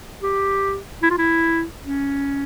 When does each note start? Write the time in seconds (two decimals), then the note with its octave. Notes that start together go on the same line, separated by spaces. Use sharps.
0.23 G4
1.03 E4
1.10 F4
1.18 E4
1.82 C#4